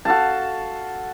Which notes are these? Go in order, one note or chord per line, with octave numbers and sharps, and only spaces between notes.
F#4 A4 F5 A5